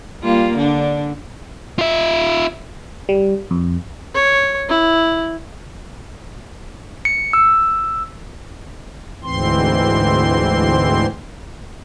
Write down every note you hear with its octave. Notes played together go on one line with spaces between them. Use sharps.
G3 A#3 F4
D3 D4
F4 E5
G3
F2
C#5
E4
C#7
E6
D2 G#2 E3 C4 C6